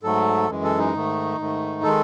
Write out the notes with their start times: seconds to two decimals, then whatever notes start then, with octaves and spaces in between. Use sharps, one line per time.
0.03 G#2 F#3 A3 A4
0.48 F#2 E3 G#3
0.63 A4
0.79 D#4
0.93 G#2 D#3 A3
1.38 G#2 D#3 A3
1.83 D#3 G#3 A4